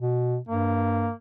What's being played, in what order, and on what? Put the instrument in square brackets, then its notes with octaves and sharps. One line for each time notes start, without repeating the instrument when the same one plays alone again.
[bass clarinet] B2
[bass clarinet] G2 [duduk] A#3